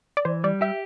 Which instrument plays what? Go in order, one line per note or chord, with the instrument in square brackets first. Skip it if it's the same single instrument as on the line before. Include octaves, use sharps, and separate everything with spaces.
[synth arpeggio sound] D5
[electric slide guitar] E3 [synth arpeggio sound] C5
[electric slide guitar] G3 [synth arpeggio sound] D5
[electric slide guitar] G4 [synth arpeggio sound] E5